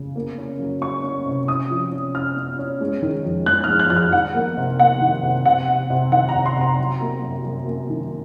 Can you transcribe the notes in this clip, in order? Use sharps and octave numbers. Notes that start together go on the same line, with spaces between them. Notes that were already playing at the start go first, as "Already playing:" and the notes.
Already playing: C#3
A#3
C#4
F#3
C#4 C#6
C#4
C3
C#4 D#6
F3
C#4
C#4 F6
C#4
C#4
G#3
D#3
F2
G#3 F#6
G#3 F6
F#6
F2 F#6
F6
D#3 F#5
A#3
C3
A#3 F#5
D#3
C3
C3 F#5
C3
C3
D#3 F#5
A#5
C3
C6
C3 A#5
F#3
A#3
F#2
F#2
A#3
D#3